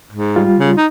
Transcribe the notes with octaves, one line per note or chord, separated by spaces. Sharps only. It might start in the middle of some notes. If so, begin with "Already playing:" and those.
G#2
G3 F4
C#3
D#4